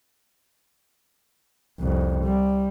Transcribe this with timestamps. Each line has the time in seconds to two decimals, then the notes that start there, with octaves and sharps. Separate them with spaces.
1.79 C2 F2
2.24 G3